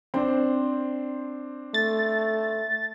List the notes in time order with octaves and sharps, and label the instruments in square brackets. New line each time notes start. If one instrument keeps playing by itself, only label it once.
[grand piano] C4 D4 [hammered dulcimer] C5
[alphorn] A3 [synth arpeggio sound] A6